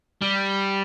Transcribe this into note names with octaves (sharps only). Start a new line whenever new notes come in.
G3